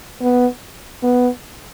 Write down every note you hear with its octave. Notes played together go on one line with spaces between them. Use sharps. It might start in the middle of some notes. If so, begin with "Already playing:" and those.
B3
B3